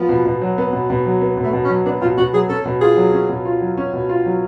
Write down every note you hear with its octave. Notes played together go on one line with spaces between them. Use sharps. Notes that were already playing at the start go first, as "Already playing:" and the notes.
Already playing: F3 B3
B2
B2
F#3
B3
B2
B2
F#3
B3
B2
A3
B2
C#4
F#3
B3 D4
B2 F4
B2 F#4
F#3 G#4
C#4 A4
B2
F4 G#4
F#3
C#4
B2
F4
F#3
C#4
B2
F4
F#3